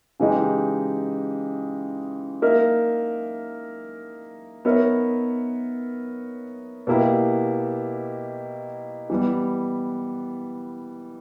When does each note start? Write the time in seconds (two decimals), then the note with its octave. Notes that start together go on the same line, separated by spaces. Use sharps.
0.20 C#3 E3 G#3 D#4 G4
2.42 A#3 D#4 A#4 E5
4.65 B3 D#4 A#4 C#5 E5
6.87 B2 A#3 E4 G4
9.10 E3 G3 B3